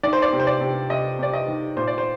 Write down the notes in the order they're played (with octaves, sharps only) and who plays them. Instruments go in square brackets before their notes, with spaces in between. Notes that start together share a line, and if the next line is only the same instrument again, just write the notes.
[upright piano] D#3 D5
C5
D5
C3
C5
D5
C3
C3 D#5
C3 D5
D#5
D#3
A#2 C5
D5
C5